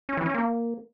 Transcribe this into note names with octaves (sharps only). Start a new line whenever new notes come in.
C#4
E3
C#4
A#3